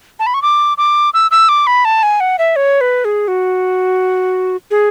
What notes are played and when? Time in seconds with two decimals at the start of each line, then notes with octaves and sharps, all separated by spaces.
0.19 A5
0.26 B5
0.34 C#6
0.42 D6
0.78 D6
1.14 E6
1.31 E6
1.49 D6
1.67 B5
1.85 A5
2.03 G#5
2.20 F#5
2.39 E5
2.56 C#5
2.81 B4
3.05 G#4
3.28 F#4
4.71 G#4